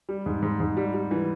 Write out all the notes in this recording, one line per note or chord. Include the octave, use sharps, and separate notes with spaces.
G3
G#2
G#2
G#2
G3
G3
E3